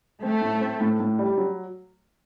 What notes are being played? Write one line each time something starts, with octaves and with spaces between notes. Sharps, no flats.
A3 C4
A2
C4
A2
A2
G3
F#3